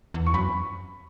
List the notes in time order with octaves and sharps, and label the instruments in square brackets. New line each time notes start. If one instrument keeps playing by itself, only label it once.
[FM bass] E2
[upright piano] C#6
[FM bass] F#2 [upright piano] B5